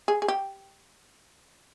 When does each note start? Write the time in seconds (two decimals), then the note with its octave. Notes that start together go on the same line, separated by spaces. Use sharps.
0.08 G#4
0.22 G#4
0.28 G4